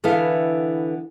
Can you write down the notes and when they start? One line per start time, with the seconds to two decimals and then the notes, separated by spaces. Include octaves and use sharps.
0.04 D3 E3 B3 E4 A4 F5